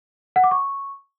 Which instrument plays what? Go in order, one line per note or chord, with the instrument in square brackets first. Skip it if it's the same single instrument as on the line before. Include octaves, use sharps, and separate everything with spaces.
[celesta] F#5
D6
C#6